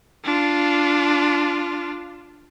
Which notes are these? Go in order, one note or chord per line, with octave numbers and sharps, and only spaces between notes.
D4 F4